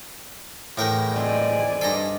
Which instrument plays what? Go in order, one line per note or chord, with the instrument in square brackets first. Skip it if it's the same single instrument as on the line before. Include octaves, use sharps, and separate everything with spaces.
[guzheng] E2 B4 G#5 [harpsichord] A2 A#4 G5
[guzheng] G#3 C4 [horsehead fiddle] D5 G#5
[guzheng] G2 D#5 C6 [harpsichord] A4 A#5